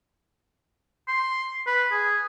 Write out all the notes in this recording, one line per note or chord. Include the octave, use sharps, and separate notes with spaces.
C6
B4
G#4